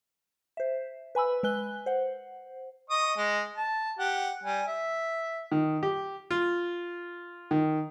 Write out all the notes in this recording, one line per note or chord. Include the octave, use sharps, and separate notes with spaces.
C5 E5
B4 G#5 B5 E6
G#3 B4 G#5 F#6 G7
C5 F#5
D#5 C#6 D#6
G#3
A5
G4 F#5
G3 G#5
E5
D#3
G4
F4
D#3